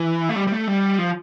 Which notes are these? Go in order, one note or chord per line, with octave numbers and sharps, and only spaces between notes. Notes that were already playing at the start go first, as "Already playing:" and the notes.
Already playing: E3
A3
G3
G3
A3
G3
F3